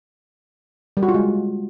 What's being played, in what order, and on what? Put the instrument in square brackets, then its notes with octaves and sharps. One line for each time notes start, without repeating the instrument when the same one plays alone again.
[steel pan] G3
F#4
F4
G#3